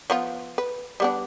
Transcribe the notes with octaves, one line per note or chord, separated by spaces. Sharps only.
F3 B3 F4
B4
G3 B3 D4